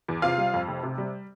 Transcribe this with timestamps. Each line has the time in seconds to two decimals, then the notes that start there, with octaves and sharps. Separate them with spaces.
0.08 E2
0.22 C3 F4 F5
0.38 G3
0.54 F2
0.69 F1
0.83 C3
0.98 G3